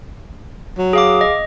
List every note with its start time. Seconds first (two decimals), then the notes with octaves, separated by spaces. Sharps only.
0.78 F#3
0.93 G#4 F5 D6
1.21 D#5